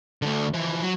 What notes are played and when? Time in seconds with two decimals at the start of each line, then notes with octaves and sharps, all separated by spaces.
0.22 D2 D3
0.53 E3 F3
0.82 F#3